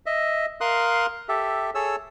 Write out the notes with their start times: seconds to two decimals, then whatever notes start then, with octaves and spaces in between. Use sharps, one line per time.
0.06 D#5 E5
0.61 A#4 F5 C6 D#6 F#6
1.29 G4 A4 E5
1.75 G#4 A4 C#5 E6